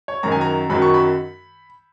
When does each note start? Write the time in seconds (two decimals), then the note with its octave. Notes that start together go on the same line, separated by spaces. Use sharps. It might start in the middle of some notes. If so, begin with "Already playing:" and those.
0.08 C#5
0.23 F#2 D#3 F#3 A#5
0.32 G#5
0.41 A#5
0.69 F#2 D#3 F#3 B5
0.82 C#6
0.94 B5